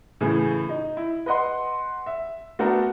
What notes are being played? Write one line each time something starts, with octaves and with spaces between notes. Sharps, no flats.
A2 C#3 E3 A3 E4 G#4
D#4
E4
B4 D#5 F#5 C6
E5
A3 B3 D4 F#4 A4 A#4